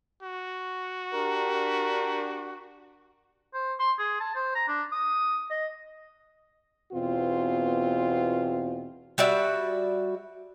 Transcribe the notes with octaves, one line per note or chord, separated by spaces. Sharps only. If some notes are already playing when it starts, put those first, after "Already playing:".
F#4
D4 G4 A#4
C5
C6
G#4
A5
C5
A#5
D4
D#6
D#5
E2 B2 C4 F4
G3 F#4 D5 E5